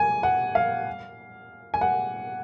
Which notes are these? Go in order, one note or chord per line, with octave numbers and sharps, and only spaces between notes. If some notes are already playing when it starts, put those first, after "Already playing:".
Already playing: G#5
F#5
F5
G#5
F#5